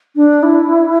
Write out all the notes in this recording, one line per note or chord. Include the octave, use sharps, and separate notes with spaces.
D4
E4